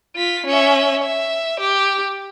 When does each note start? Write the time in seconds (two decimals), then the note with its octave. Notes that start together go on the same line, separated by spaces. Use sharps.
0.16 F4 B6
0.46 C#4 E5
1.03 E5
1.60 G4